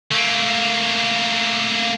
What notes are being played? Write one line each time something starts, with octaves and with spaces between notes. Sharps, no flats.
A3 A#3